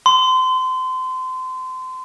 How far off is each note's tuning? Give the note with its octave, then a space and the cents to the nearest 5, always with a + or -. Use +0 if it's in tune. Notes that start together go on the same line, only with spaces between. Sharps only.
C6 -30